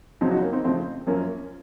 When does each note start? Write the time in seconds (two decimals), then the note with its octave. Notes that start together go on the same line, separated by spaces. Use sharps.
0.21 F2 C#3 F#3 C4 D#4
0.31 D#4 F#4
0.42 A#3 C#4
0.53 C4 D#4
0.64 F2 C#3 F3 A3 C4
1.07 F#2 F3 A#3 C#4